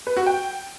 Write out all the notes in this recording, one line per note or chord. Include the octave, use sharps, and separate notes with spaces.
B4
F#4
G5